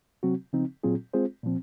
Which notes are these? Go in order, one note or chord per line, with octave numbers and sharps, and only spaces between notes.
C3 F#3 C4 F#4
C#3 F3 C4 D#4
A#2 F#3 C4 F4 G#4
G#3 C4 F4 G#4 C5
A#2 F3 C4